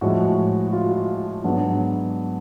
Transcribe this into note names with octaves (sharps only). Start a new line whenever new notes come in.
A2 F3 G#3 F#4
F#4
F4
F4
G#2 F#3 B3 D4